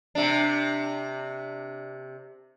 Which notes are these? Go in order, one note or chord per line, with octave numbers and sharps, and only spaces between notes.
C3 D4